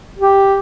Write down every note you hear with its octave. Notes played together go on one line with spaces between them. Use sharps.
G4